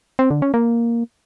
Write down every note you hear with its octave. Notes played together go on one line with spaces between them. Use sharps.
C4
D3
C#4
A#3